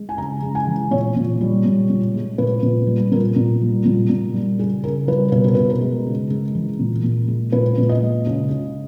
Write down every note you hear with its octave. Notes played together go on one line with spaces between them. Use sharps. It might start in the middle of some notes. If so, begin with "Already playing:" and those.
Already playing: G#3
G#5
C#3 A#5
G#3
G#5
E3
A#2 C#5
A#2
G3
A#2
A#2
G#3
A#2 B4
A#2
G3
A#2 A#4
A#2
G3
A#2
A#2
G3
C#3 G#4
C#3 A#4
G3 B4
B2 B4
A#4
B2 B4
A#4
G#3
C#3
G#3
E3
A#2
A#2
G#3
A#2 B4
A#2
D#5
G#3
C#3
C#3